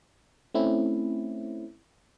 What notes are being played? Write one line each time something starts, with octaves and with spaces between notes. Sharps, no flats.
A3 C4 C#4 E4